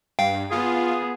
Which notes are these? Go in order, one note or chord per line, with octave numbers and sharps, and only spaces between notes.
G2 F5 G5
B3 F4 G#4